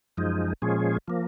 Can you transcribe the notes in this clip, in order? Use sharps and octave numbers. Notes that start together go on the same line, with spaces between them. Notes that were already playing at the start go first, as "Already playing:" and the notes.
F#2 F3 G#3 D#4
A#2 F3 G#3 C#4 G#4
F3 A#3